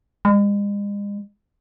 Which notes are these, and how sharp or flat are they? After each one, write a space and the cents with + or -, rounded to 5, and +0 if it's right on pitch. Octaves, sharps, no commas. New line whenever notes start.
G#3 -40